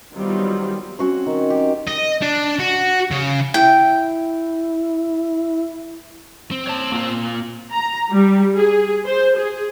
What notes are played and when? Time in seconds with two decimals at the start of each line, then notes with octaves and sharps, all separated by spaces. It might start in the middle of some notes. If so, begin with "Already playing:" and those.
0.15 D#3 F#3 G3 B3 C4 F4
0.99 C4 C#4 F#4 C5
1.26 D#3
1.50 G4
1.87 D#5
2.22 D4
2.59 F#4
3.11 C#3
3.54 E4 G5
6.51 C4
6.67 C#5 A5
6.92 A#3 F4 F5
7.72 A#5
8.11 G3
8.55 G#4
9.05 C5
9.37 G#4